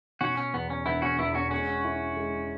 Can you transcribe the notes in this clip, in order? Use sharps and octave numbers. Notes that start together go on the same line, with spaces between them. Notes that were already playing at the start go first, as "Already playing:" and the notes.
B2 C#4 F#4
C#4
E2 B3
C#4
E1 B3 E4
C#4 F#4
E2 B3 E4
C#4 F#4
G#3 C#4 F#4
E4
G#3